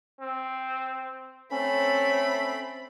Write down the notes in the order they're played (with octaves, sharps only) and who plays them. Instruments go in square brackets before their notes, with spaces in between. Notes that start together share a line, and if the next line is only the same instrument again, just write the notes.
[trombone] C4
[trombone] A3 [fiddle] C4 B5 [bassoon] C#4